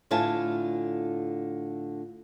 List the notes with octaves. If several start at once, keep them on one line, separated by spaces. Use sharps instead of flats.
A2 D3 F4 E5 G#5 A5